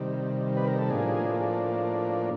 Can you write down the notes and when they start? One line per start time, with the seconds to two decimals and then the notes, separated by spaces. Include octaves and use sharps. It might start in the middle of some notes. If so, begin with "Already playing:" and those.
Already playing: C3 D#3 G3
0.57 B4
0.68 A#4
0.78 A4
0.90 A2 F3 A#3 D4 G#4